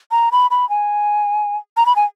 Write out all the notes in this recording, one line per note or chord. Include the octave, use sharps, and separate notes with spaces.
A#5
B5
B5
G#5
A#5
B5
G#5